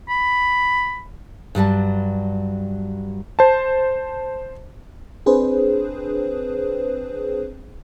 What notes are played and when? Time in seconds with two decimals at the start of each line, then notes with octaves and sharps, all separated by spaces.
0.09 B5
1.55 G2 F#3 G3 A5
3.39 C5 A5
5.26 C4 D4 G#4 B4 C5